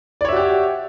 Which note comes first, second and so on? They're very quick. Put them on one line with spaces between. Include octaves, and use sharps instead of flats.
D5 C#5 E5 F#4 G4